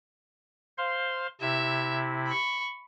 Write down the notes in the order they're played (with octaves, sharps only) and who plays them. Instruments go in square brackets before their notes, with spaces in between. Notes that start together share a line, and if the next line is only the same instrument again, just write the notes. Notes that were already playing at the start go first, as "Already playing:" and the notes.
[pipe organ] C5 F5 C6
[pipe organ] C3 E4 [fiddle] E5
[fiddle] B5 C#6